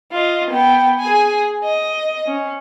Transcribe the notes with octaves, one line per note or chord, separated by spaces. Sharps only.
F4 D#5
B3 G5
G#4 G#5
D#5
C#4